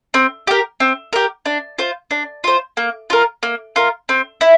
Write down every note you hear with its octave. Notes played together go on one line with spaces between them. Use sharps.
C4
G4 A#4
C4
G4 A#4
D4
F4 C5
D4
F4 C5
A#3
F4 A#4
A#3
F4 A#4
C4
E4